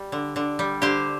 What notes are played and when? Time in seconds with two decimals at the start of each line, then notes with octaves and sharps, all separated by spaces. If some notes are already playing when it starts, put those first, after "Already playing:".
Already playing: G3
0.12 D3
0.36 D3
0.59 G3
0.82 D3 G4 C5